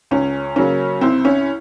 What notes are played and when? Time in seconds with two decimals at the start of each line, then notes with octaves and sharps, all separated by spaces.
0.11 C#2 C#4
0.56 C#3 F#3 A#3 C#4
1.01 C2 C4
1.25 C#4